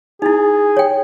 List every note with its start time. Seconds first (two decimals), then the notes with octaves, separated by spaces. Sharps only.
0.22 D#4 E4 G#4
0.77 C#5 G5